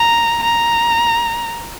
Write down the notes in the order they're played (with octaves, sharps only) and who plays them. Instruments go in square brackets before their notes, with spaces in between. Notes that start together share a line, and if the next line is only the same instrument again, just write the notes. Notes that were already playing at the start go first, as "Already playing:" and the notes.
Already playing: [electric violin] A#5
A#5